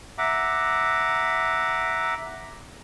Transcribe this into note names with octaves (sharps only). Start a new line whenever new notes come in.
E5 F#5 A#5 D6